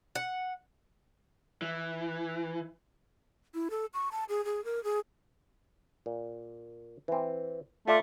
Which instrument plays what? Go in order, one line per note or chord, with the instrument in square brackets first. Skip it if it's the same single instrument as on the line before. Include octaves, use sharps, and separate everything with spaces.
[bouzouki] F#5
[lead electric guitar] E3
[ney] E4
A4
C#6
A5
G#4
G#4
A#4
G#4
[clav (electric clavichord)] A#2
E3 C4
[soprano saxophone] A3 [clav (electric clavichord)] F4 D5 E5